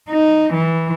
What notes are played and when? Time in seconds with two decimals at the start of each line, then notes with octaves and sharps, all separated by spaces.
0.10 D#4
0.54 E3